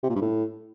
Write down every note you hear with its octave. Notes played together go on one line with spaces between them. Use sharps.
C3
A#2
G2
A2